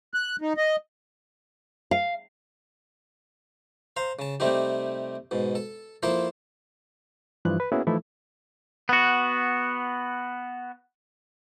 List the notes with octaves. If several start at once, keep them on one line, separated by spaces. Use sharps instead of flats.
F#6
D#4
D#5
F5
C5 F5 A#5
C#3 A5
C3 G3 A3 C4 D#4 G4
G#2 B2
A4
F3 A#3 E4 A4 A#4 C5
G2 E3 F3 F#6
B4
A#3 B3 C#4 E4 F#4 G#4
E3 F3 A3 D#4 E4 A4
B3 F#4